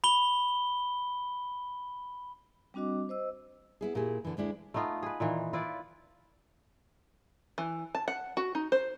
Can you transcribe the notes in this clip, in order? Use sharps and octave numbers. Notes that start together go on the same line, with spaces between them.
B5 G7
G3 C4 D4 F#4 D#5 D6
C5 D#5 E6
B3 E4 G#4
A#2 E4 G4 G#4
D3 E3
D2 G#3 D4 E4
A3 B3 D#4 F4
G#4 B4
A#2 D#3 E3
E4 F4 B4 D5
E3
A5
F#5
F#4
D#4
C5